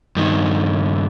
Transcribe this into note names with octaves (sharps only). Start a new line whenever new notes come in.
G2 D#3